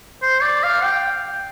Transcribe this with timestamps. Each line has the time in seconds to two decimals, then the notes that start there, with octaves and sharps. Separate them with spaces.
0.22 C5
0.42 D5
0.63 F5
0.84 G5